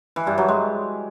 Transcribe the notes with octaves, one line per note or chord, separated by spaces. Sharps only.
E3
G2
F#3
G#3